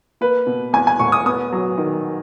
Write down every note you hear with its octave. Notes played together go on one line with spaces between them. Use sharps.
A#3 B4
B2
E2 G#5
G#5
E1 C#6
D#6
B3 D#6
F#3
D#3